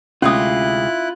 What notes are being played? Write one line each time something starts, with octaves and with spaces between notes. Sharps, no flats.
D2 C3 G#3 C#4 E4 F4 D#6 F#6